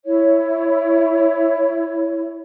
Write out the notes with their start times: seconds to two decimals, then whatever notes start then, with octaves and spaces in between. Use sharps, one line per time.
0.06 E4 C#5